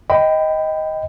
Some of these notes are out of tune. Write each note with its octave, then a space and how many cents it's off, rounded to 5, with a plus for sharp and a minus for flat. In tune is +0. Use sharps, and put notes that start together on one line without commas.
D#5 +10 G5 +0 B5 +20